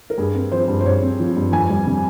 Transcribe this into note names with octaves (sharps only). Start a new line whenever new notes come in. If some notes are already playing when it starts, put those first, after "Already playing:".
A#4
G2 G#4
C4
F3 C5
G2
C5
G2 C#5
C4
F3
G2
F2 G#5
G3
C3